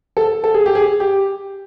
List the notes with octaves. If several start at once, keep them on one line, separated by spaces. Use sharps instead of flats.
A4
A4
G#4
G4
G#4
G4